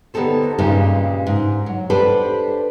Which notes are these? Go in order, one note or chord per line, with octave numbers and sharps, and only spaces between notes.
D3 B3 D#4 G4 A4 C5
G2 A#2 C#3 G#3 D#4 G4
G#2
F#3
D4 G4 A4 B4 C5 D5